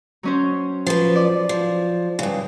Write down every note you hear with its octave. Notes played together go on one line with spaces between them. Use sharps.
F#3 C#4 C5
F3 B4
D5
F3
G2 C#3